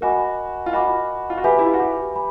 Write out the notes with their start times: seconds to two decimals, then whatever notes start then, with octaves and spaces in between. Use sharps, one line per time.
0.01 F#4 A#4 D#5 G#5 B5 D6
0.66 F4
0.72 F#4 A#4 D#5 G#5 B5 D6
1.30 F4
1.38 F#4
1.44 G4 B4 E5 G#5 B5
1.59 E4
1.66 F4
1.74 F#4
1.80 G4
2.16 G#5 B5